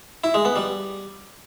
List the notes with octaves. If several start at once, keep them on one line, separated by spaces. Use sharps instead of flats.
E4
G#3
B3
G3